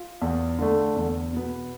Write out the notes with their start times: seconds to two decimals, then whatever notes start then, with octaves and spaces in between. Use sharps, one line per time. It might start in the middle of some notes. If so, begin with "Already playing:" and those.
Already playing: F4
0.22 E2
0.59 D3 A3
0.96 E2
1.33 B2 B3